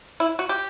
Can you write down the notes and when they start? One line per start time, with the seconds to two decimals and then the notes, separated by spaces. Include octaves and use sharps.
0.20 E4
0.39 F#4
0.49 G4